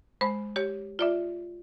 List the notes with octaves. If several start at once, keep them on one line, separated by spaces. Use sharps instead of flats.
G#3 C5 B5
G4 C#5
F4 D5 E5